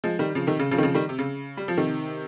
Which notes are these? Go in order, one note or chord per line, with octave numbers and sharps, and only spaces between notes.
F3 G#3
D#3 G3
C#3 F3
C3 D#3
C#3
C#3 F3
D#3
C#3 F3
D#3 G3
C3
C#3
G3
F3
C3 D#3